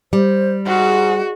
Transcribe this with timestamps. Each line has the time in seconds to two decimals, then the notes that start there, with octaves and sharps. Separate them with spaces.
0.13 G3 C5
0.66 G#2 F#4 F#5